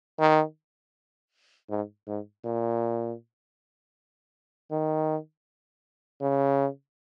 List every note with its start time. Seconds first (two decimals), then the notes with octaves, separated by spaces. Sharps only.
0.19 D#3
1.70 G#2
2.07 G#2
2.45 A#2
4.71 D#3
6.22 C#3